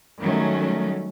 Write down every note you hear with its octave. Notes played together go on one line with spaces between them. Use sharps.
D#3 F#3 G3 A3 C#4